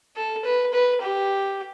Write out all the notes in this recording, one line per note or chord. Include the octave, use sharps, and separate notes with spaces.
A4
B4
B4
G4